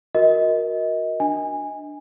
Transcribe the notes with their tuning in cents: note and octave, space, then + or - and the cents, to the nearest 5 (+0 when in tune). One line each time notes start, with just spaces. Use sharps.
F#4 -15 A#4 +10 D#5 +25
D4 +10 G#5 -15